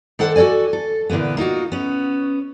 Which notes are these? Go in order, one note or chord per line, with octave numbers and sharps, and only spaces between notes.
D#3 D4 A4 C5 F#5
F#4 A4 C5 D5 G#5
A4
A#2 D3 E3 A#3 B3
A#3 D#4 F4 F#4
B3 C#4